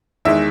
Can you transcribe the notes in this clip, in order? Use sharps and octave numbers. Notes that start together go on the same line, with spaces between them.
E2 D#3 G#3 E5